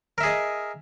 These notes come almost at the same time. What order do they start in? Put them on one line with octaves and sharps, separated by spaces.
A#4 E5 G#4 D#5